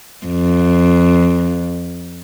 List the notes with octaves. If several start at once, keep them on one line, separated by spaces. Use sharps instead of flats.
F2